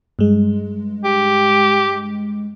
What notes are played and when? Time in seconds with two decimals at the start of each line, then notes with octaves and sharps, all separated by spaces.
0.19 G2 G#3
1.05 G4